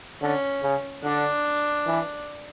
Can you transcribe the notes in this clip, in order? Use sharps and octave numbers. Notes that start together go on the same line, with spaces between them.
D3 C#4
C#3
D3 D4
E3